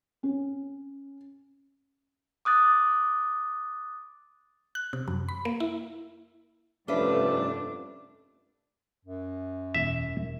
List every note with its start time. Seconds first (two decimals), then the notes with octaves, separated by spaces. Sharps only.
0.23 C#4
2.45 D6 D#6 F#6 A6
4.75 F#6
4.93 C3
5.08 F#2
5.29 B5
5.45 A#3
5.60 E4
6.88 F1 G2 A3 C#4 D4 B4 E5
9.05 F#2
9.74 E1 E5